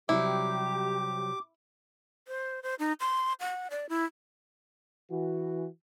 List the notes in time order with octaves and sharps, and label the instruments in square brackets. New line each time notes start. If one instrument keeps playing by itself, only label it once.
[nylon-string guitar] C3 F#3 G3 [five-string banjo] E4 [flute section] G4 [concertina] D6
[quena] C5
C5
D#4
C6
F#5
D5
E4
[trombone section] E3 F#4